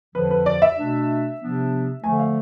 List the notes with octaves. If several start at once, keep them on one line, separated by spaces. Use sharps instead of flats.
F2 D3 F3 B4
B4
D5
E5
B2 A3 D4
C3 F3 B3 D4
D3 F3 A3 G#5
F5